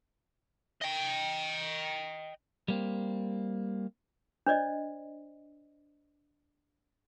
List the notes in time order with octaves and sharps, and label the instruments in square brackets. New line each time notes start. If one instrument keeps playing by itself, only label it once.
[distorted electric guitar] D#5 G5
[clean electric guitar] G3 A#3 C4
[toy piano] D4 C5 D5 D#5